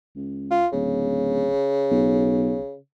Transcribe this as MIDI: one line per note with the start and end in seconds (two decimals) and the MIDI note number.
0.16 0.63 37
0.51 0.67 65
0.73 1.51 26
0.73 2.77 49
1.91 2.57 35